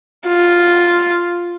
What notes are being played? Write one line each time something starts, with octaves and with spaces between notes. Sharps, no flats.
F4